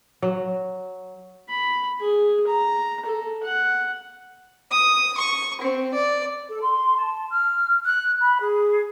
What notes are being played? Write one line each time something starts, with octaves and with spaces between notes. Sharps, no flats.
F#3
B5
G#4
A#5
A4
F#5
D#6
C#6
C4
D5
A4
C6
A5
F6
F#6
B5
G#4